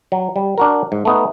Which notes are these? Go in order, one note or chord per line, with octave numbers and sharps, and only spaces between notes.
F#3
G3
D4 F#4 A#4
G#2
A3 B3 D#4